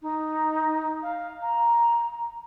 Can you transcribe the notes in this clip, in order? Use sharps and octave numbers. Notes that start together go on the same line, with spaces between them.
D#4
F5
A#5